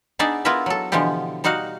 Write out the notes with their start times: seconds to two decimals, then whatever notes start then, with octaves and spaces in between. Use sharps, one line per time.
0.19 B3 D4 D#4 G#4 D5 E5
0.45 B3 E4 F4 A#4 B4 E5
0.66 F#3 A4
0.92 B2 D3 E3 F3 B3 G4
1.44 G3 D#4 F#4 F5 F#5